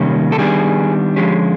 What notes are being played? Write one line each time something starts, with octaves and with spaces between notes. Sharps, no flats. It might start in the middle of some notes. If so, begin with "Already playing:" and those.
Already playing: C3 D#3 G3 A#3 C#4
A4
D#3 G3 B3 D4 G#4
D3 F3 G#3 C#4 G4